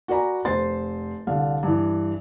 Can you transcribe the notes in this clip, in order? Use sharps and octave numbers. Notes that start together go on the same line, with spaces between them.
F#4 A#4 D5 G#5 A#5 B5
F1 B4 C5 C6 A6
C2 D3 F5
G2 E3